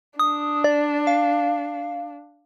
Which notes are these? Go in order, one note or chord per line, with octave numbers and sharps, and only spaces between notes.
D4 D#6
D5
F5